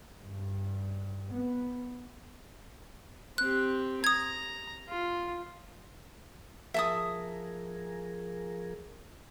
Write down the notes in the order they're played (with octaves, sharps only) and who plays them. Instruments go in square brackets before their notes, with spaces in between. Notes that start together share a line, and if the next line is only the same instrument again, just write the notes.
[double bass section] G2
B3
[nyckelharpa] C4 G4 [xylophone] F#6
[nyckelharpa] A#5 [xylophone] D#6 G#6
[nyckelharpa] F4
[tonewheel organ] F3 G#4 A#4 [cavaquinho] E5 A5 D#6